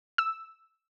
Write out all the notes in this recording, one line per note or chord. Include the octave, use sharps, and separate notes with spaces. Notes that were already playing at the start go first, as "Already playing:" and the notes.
E6